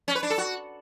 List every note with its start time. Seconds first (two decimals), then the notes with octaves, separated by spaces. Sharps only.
0.08 C#4
0.15 B4
0.23 D4
0.30 A4
0.38 F#4